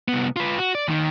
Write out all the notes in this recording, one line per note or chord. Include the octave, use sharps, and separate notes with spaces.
C2 B3
F4 B4
F#4
D5
D#2 D#3